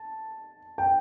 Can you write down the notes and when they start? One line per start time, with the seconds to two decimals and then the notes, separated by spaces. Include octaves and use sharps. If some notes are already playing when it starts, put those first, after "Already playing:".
Already playing: A5
0.78 G5